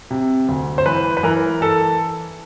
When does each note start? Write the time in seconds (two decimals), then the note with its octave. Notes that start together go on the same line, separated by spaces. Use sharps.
0.11 C3
0.49 D2
0.78 C5
0.86 E3 B4
1.17 B4
1.23 E3 A#4
1.61 E3 A4